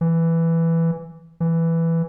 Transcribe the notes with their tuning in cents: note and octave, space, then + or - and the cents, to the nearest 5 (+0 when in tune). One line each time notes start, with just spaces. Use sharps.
E3 +5
E3 +5